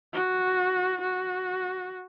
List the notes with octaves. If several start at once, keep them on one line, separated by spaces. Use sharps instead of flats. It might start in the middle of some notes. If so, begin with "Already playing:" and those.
F#4
F#4